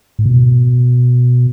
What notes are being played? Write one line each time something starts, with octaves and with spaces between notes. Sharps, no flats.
A2
B2